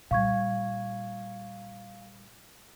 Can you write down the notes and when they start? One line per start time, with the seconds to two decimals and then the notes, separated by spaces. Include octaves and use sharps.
0.11 A#2 G3 F5 C#6 G#6